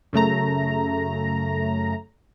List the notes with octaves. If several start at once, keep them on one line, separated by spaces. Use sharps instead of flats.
F#2 C#3 A3 A#5